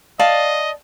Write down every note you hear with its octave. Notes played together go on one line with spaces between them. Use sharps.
D5 D#5 F5 A5